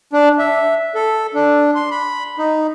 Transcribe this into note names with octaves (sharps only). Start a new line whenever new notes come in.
D4
E5
A4
D4
C6
B5
D#4